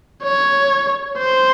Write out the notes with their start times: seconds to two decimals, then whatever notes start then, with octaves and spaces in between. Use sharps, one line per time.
0.23 C#5
1.18 C5